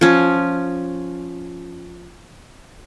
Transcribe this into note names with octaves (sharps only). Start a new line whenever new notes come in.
F3 C#4